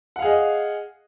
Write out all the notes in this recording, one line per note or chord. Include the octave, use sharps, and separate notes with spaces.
G#4 D#5 F5 F#5